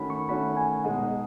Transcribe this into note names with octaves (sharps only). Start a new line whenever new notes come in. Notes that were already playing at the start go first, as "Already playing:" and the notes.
Already playing: D#3 A3 C#4 F#4 B5
C#6
D#3 A3 C#4 F#4 B5
G#5
B2 G#3 D#4 F#5
D#5